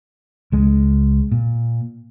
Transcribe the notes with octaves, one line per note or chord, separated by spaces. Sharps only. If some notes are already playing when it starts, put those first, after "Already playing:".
C#2 G#3
A#2